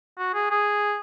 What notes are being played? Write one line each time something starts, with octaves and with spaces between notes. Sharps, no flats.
F#4
G#4
G#4